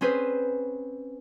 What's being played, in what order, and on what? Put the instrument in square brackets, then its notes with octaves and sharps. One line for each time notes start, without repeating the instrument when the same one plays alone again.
[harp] C4 C#4 G#4 B4 C5